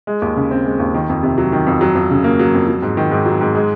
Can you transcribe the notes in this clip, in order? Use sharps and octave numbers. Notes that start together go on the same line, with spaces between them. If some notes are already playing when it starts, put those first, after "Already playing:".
G#3
D#2
C#3
C4
G#3
D#2
D#3
F2
C3
F#3
D#3
F2
F#3
F2
C#3
A#3
F#3
F2
F#3
G#2
D#3
G#2
F#3
G#2
G#3